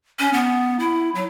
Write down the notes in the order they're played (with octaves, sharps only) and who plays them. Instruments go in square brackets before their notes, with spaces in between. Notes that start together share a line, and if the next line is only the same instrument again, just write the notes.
[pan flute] C#4
B3
E4
F#3